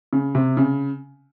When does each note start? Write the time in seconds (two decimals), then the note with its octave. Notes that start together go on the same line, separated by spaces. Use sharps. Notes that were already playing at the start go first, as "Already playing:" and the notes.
0.13 C#3
0.35 C3
0.57 C#3